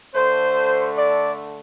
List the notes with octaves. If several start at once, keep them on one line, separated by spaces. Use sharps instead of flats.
D3 A3 C5
D5